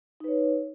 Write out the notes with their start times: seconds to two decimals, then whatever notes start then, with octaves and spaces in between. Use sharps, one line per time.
0.20 D#4
0.24 B4
0.28 C#5